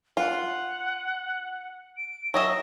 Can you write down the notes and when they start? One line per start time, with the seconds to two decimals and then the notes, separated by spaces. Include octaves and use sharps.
0.17 F4 F#5
1.97 D7
2.34 F#3 D#5 E5 A#6